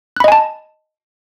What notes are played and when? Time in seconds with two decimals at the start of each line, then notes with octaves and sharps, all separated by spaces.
0.16 F#6
0.20 B5
0.24 D#5
0.28 G#5
0.32 A5